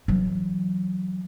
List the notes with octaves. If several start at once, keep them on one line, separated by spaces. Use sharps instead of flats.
E3 F#3